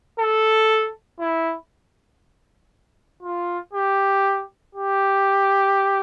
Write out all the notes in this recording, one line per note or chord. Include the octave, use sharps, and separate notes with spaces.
A4
E4
F4
G4
G4